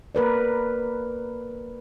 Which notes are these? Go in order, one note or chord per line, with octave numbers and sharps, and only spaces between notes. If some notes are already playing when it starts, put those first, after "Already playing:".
A#3 A#4 B4 D5